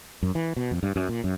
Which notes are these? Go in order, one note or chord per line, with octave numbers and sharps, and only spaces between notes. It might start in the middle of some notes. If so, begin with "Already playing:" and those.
F#2
E3
B2
F2
G2
F#2
A#2
F#2